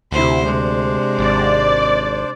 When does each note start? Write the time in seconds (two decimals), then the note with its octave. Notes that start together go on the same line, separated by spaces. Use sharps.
0.12 D2 C3 E4 C5
0.45 C3 G#3 D4 C5
1.19 G#1 D5